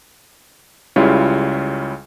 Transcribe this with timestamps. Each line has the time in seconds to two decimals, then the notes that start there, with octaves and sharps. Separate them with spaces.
0.96 C#2 C#3 G3 E4 F4 C#5